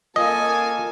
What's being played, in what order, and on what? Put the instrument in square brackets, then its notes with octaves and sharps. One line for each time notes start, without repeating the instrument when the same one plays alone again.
[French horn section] A#3 F4 [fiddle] A4 G#5 [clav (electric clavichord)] D#5